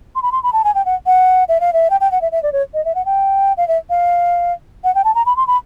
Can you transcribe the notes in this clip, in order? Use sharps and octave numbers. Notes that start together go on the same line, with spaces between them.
C6
B5
C6
B5
A5
G#5
G5
F#5
F#5
E5
F5
E5
G5
G5
F#5
E5
E5
D5
C#5
D#5
E5
F#5
G5
F5
E5
F5
F#5
G5
A5
A#5
B5
C6
B5